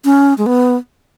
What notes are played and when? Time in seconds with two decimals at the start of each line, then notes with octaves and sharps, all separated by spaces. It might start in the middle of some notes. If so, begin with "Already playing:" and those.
0.05 C#4
0.38 G#3
0.46 B3